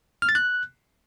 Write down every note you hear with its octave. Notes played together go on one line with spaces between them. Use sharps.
F6
A6
F#6